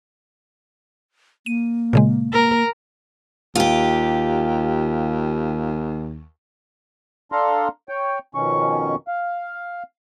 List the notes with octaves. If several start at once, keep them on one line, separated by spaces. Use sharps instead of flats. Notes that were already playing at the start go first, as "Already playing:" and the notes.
A#3 D#7
A#2 C#3 G#3
A#3 A#4
D#2 F4 G4
D4 A4 F5 A#5 C6
C#5 G5
F2 B2 D#3 C#4 C#6
F5